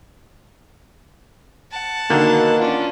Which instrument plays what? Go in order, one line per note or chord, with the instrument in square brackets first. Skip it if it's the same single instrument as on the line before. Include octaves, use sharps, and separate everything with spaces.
[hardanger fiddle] F#5 A5
[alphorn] B2 [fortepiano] D3 D#3 [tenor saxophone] A#3
[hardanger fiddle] C#4 D4 [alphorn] F4